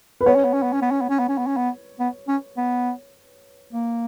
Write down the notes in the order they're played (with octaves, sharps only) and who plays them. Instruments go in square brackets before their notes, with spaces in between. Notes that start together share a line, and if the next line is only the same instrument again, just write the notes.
[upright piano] B4
[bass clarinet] B3 [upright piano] C#5
[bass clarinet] C#4
B3
C#4
B3
C#4
B3
C#4
B3
C#4
B3
C#4
B3
C#4
B3
B3
C#4
B3
A#3